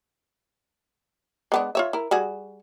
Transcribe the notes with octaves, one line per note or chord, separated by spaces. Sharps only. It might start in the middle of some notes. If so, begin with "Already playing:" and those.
G#3 B3 D4
F4 C#5 E5
E4 A#4
G3 F#4 G#4